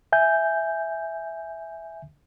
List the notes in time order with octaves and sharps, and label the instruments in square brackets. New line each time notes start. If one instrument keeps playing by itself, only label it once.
[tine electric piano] E5 G#5 G6